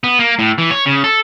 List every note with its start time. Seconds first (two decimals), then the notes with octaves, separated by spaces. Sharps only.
0.04 B3
0.19 A#3
0.39 A2
0.58 E3
0.71 C#5
0.86 C#3
1.04 A4